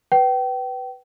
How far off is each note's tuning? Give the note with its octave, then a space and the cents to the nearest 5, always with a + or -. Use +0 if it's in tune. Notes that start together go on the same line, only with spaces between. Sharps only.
B4 +0 G5 -30